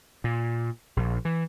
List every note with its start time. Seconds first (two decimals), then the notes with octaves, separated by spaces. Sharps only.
0.24 A#2
0.97 A#1
1.25 E3